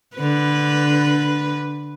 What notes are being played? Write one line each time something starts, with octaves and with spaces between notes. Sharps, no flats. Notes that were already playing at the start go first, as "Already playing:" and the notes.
D3 B4